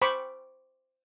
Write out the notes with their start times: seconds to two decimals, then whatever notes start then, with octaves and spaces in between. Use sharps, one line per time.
0.02 C5 B5 C#6 D6